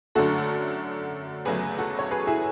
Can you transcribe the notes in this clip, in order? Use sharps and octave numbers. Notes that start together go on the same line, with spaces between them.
F#2 D3 A3 F#4 A4
E2 C#3 F#3 A3 G#4 B4
F#4 A4
C#5
G#4 B4
E4 G#4